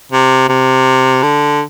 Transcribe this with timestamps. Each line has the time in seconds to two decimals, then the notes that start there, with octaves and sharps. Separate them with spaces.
0.12 C3
0.49 C3
1.23 D3